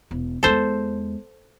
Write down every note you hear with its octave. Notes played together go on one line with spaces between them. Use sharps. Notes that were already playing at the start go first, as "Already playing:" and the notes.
E1
E2 G#3 A4 C5